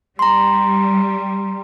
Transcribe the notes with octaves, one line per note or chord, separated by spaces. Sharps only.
G3 A#5 C6